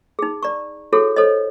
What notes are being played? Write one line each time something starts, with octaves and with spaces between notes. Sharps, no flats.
D#4 G#4
D5 A#5 C#6
E4 F#4 G#4 A4 C#5
A4 C5 C#5 D#5